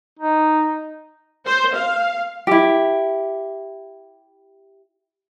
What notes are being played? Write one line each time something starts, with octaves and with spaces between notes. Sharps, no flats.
D#4
C5
F5
E4 G4